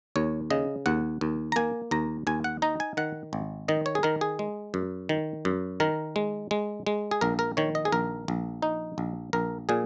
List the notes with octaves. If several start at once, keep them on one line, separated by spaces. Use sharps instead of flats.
D#2 C#5
C#3 D#5
D#2 F#5
D#2
A#5
A#3 G#5
D#2 A#5
D#2 G#5
F#5
D#4 A#5
G#5
D#3 F#5
G#1
D#3 D#5
C#5
G#4
D#3 A#4
G#4
G#3
F#2
D#3
F#2
D#3 A#4
G#3
G#3
G#3
G#4
A#1 A#4
A#4
D#3 C#5
D#5
G#4
A#1 A#4
A#1
D#4
A#1
A#1 A#4
A#2 G#4